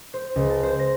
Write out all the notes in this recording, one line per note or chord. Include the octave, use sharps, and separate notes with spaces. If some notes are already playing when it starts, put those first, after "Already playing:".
C5
C#2
A5
C5
A#6